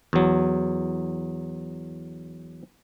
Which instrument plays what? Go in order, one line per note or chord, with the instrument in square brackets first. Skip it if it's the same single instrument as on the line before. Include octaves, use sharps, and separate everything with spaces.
[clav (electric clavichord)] E2 F#3